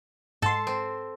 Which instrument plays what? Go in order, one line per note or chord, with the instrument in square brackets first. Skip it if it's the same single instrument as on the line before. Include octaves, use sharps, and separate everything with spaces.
[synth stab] G#2 C6 [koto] A4
[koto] C4